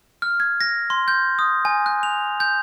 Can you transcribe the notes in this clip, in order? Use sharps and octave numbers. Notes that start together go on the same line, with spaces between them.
F6
G#6
A#6
C6
G6
D#6
G#5
F#6
F7
G6